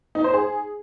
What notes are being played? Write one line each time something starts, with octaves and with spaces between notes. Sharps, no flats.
D#4
C5
G#4